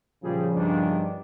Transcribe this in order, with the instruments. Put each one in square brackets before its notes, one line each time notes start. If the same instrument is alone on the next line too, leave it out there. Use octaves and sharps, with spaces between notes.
[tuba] A#2 [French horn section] C#3 F3 [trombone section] G3 G#4
[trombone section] E2 D#3 D4 [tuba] G2